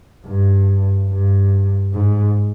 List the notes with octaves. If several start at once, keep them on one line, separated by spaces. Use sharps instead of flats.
G2
G2
G#2